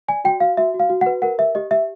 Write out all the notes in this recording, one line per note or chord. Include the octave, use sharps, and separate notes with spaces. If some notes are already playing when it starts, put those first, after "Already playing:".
D5 G#5
F#4 G5
F#4 F5
F#4 E5
F#4
F5
F#4
F#5
B4
A#4 F#5
G4 E5
G4 D#5
G4 E5